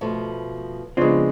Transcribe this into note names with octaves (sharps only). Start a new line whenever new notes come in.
B2 F3 A3
C#3 F3 G#3 B3 C4 D4